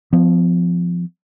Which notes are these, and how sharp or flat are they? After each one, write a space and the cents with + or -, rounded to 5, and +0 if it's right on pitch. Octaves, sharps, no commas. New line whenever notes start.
F3 +0 B3 +45